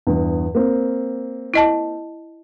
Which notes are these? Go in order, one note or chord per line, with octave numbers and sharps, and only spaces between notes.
E2 G2
A#3 C4
E4 D#5 A5